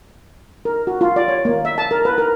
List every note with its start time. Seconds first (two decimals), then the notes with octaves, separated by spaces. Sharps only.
0.65 A#4
0.87 F#4
1.01 F4
1.16 D5
1.28 C#5
1.45 A#3
1.65 E5
1.78 A5
1.91 A#4
2.05 B4
2.18 A#4